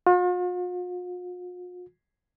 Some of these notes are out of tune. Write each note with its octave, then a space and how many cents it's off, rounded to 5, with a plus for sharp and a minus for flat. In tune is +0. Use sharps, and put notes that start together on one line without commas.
F4 +45